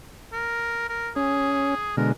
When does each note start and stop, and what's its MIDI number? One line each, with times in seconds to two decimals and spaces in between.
0.33 0.87 70
0.89 1.10 70
1.16 1.75 61
1.16 1.95 68
1.97 2.12 47
1.97 2.12 50
1.97 2.12 56
1.97 2.09 70